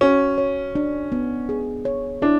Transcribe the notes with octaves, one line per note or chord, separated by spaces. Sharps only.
C#4 F#4
C#5
D4
B3
G#4
C#5
D4 E4